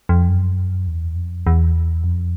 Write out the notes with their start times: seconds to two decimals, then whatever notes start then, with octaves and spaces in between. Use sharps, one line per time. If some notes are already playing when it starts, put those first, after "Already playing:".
0.09 F2
0.28 F#2
0.87 E2
1.16 F2
1.47 E2
2.04 F2